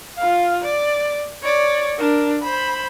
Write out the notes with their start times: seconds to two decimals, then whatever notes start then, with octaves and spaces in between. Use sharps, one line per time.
0.17 F4 F5
0.62 D5
1.43 C#5 D5
1.98 D4 A#4
2.41 C5 B5